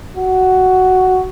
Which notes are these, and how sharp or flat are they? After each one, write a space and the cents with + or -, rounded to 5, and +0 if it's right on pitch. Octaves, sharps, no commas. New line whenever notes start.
F#4 +10